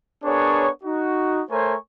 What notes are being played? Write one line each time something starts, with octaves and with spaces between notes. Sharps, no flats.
B3 D4 G#4 A#4 C#5
D#4 F#4
A3 A#4 C5 C#5 G#5 C#6